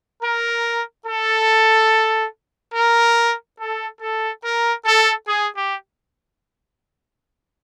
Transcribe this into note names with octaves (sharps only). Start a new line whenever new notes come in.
A#4
A4
A#4
A4
A4
A#4
A4
G#4
G4